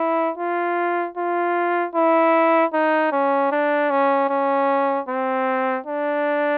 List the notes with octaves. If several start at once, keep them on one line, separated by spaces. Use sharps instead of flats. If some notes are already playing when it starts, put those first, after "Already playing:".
Already playing: E4
F4
F4
E4
D#4
C#4
D4
C#4
C#4
C4
D4